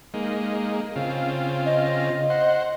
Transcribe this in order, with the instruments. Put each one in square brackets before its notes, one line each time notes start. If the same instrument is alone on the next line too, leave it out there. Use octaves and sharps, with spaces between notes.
[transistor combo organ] G#3 A#3 D#4
C#3 C4 F4
[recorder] D#5
[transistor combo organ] C5 F#5